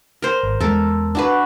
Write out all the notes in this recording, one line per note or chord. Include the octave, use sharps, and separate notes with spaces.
A#4 C5
G#1
E2 G#3 A4 A#4
D4 F#4 B4